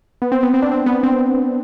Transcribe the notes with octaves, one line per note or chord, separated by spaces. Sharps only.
B3
C4
B3
C4
D4
C4
B3
C4